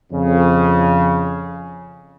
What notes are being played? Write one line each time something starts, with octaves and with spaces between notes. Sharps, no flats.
F2 C#3